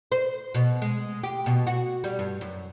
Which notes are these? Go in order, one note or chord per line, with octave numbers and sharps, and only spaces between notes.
C5
B2
G#3
G4
B2
F#4
G3
G2
F#2